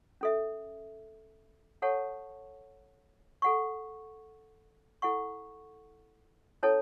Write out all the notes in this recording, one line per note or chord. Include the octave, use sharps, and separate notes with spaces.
C#4 A4 E5
A4 C#5 F#5 A5 C#6
A4 F#5 C#6
E4 A4 F#5 C#6
C#4 E4 A4 C#5 A5